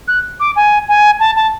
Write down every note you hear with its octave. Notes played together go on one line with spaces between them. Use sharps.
F#6
D6
G#5
G#5
A5
A5